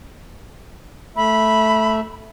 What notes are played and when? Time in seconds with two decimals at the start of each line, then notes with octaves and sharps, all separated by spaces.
1.16 A3 E5 B5